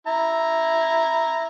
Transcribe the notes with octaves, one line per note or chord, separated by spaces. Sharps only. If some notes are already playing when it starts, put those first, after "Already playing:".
E4 A#5